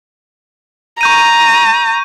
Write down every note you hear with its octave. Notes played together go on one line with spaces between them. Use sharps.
A#5 C#6 G6 D#7